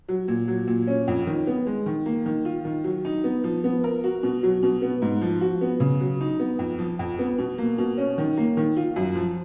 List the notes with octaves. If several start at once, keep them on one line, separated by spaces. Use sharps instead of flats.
F#3
A#2
F#3
A#2
C#4
F2
D#3
B3
G#3
D#3
A#3
D#3
F4
D#3
F#3
D#4
B3
F3
B3
A#4
F#4
B2
F#3
B2
B3
G#2
F3
F#4
B3
C#3
F#3
D#4
B3
F2
F3
F2
B3
B2
A#3
B2
C#4
D#3
A#3
D#3
F4
F#2
F3